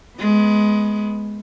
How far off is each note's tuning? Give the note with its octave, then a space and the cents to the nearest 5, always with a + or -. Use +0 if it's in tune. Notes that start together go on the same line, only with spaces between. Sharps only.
G#3 +15 B3 +0